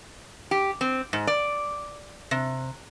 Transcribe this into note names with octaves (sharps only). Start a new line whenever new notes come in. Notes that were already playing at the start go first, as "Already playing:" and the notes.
G4
C4
G#2
D5
C3